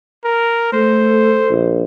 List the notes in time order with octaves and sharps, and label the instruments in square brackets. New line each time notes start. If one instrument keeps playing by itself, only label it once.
[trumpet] A#4
[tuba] A3 [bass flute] A4 [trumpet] C5
[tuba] A#1